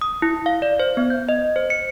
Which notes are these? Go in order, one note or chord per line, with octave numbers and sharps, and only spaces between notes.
D#6
E4
F5
D5
C5
B3
G6
D#5
C5
C#7